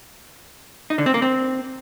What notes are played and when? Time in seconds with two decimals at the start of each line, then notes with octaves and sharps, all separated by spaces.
0.90 D#4
0.98 D3
1.06 C4
1.14 A#3
1.22 C4